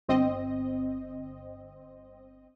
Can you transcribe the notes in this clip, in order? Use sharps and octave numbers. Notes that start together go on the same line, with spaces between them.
G1 C4 D#5